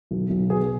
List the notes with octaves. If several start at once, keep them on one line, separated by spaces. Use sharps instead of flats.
B1
B1
B2 G#4